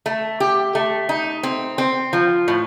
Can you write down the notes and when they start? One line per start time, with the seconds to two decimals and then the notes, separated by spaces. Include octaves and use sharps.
0.06 A3
0.40 G4
0.75 A3
1.09 D#4
1.43 C4
1.78 C4
2.13 F3
2.48 A2